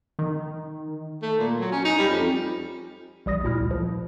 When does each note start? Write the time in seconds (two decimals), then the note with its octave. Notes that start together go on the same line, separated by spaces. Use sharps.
0.19 D#3
1.23 A3
1.39 A#2
1.59 F#3
1.72 C#4
1.85 D#4
1.98 G3
2.10 F2
3.26 A#1 G3 D#6 A#6
3.43 D2 A#2 E4 F6
3.71 F3